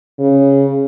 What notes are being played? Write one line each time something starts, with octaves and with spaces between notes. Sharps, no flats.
C#3